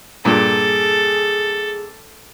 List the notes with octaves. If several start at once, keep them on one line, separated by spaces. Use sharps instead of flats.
G2 A#2 G#4 A4